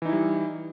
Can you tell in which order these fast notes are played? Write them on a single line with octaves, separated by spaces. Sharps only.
E3 D#4 E4 G3